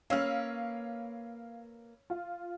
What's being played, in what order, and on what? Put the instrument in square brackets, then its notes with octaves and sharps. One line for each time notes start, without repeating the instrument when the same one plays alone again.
[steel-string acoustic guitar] A#3 B4 [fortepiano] C#4 [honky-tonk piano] F5 E6 F6
[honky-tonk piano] F4